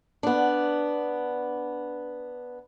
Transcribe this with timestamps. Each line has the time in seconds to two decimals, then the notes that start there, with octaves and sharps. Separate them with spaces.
0.23 B3 D4